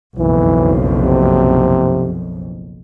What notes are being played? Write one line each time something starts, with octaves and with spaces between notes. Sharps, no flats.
F#1 B1 F2 E3
C3